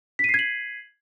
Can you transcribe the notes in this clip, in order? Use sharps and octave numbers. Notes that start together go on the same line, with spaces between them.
G#6 B6 C7 D#7 F#7